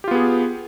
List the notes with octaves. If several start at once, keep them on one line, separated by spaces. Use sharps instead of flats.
B3 F4 G4 G#4